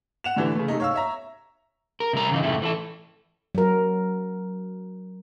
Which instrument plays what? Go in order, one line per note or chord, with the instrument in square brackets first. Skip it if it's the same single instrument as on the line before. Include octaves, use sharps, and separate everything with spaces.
[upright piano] F#5 E7 F7
A2 D3 E3 G4
C#3 A3
C3 A3 D#4
C#5 F5 E6
C#5 E5 A#5
[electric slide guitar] A#4
C3 G3 A#5
C#3 E3 D#4
F#2 A2 C3 A3 E4
E3 F4 A4
[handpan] F#3 A#4